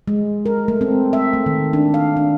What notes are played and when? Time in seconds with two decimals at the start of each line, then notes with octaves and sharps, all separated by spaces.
0.08 G#3
0.46 A#4
0.68 A3
0.81 C4
1.13 E5
1.33 A3
1.46 D#3
1.73 D4
1.94 F5
2.17 D4